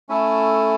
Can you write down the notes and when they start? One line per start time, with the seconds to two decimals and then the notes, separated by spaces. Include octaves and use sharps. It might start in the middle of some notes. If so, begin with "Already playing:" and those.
0.09 A3 C#4 E4 A4